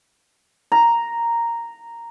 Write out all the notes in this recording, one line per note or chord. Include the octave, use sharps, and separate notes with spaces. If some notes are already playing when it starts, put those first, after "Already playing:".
A#5